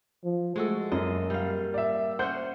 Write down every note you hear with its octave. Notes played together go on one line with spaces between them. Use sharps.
F3
G#3 A3 F#4 A4
F#2 A#3 D#5
G3 F5
D5 E5
C#4 C5 F#5 G6